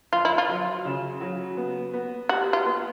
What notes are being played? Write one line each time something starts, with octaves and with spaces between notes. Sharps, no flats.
F2 F4
E4
F4
F#3
C#3
F#3
B3
B3
F#4 G4
F4
B3